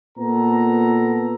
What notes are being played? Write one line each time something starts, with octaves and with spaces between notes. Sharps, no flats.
A#2 B3 A4 A#5